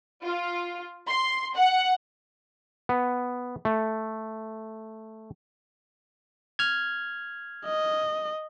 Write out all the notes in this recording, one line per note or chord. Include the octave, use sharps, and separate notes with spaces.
F4
C6
F#5
B3
A3
F6 G#6
D#5